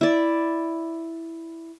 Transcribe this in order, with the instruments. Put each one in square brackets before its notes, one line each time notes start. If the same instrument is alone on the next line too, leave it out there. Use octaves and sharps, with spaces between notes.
[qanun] E4 D5